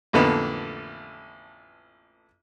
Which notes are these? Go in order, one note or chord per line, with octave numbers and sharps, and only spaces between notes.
A1 F2 D3 A#3 B3 B5